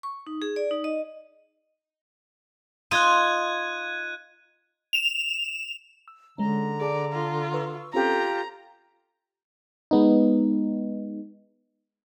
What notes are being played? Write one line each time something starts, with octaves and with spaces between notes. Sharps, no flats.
C#6
D#4
G#4
D5
D#4
D#5
D#4 F4 F#6 G#6 D#7
E7 F7
E6
D3 G#3 C#4 A#5
G#4 D5 A5
F4
B4 C#6 E6
C4 C#4 F4 G4 A4 A#5
G#3 B3 D#4